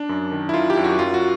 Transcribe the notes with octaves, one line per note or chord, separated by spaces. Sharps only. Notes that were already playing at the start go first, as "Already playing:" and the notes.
Already playing: D4
F#2
D#3
E4
D#3 F4
G4
F#2
F#4
F#2 F4
F#4